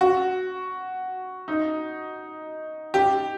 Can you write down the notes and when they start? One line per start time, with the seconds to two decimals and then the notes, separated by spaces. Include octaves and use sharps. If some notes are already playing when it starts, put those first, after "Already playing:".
0.01 F#4
1.48 D#4
2.94 G4